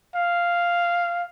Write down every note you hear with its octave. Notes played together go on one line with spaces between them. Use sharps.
F5